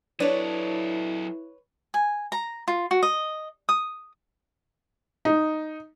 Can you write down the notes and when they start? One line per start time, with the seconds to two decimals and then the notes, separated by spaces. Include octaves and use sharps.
0.20 F#3 D4 E4 A4 B4 C#5
1.94 G#5
2.32 A#5
2.68 F4
2.91 F#4
3.03 D#5
3.69 D#6
5.25 D#4